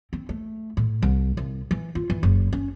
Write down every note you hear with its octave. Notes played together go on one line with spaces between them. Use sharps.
C4
A3
A2
C2
C2
E3
F4
E3
F#1
C#4